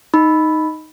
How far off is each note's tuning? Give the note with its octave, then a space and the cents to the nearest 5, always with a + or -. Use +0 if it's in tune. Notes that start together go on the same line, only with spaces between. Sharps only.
D#4 +0 B5 +0